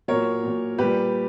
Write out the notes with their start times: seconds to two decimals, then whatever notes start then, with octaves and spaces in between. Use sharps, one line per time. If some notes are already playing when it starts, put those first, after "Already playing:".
0.08 A#2 F#3 A#4 C#5
0.43 A#2 F#3
0.78 A#2 G3 G4 B4